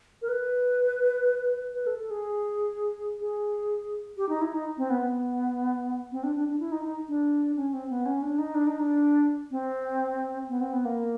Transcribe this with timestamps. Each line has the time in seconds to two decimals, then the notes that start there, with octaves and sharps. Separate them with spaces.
0.22 A#4
0.29 B4
1.74 B4
1.87 A4
1.99 A4
2.11 G#4
3.20 G#4
4.17 G4
4.29 D#4
4.41 E4
4.54 D#4
4.78 C4
4.90 B3
5.02 B3
6.12 C4
6.23 D4
6.36 D4
6.48 D4
6.60 E4
6.72 D#4
6.84 D#4
7.08 D4
7.56 C#4
7.73 C4
7.90 B3
8.06 C#4
8.22 D4
8.38 D#4
8.55 D4
8.67 D#4
8.79 D4
9.51 C4
10.49 B3
10.61 C4
10.73 B3
10.85 A#3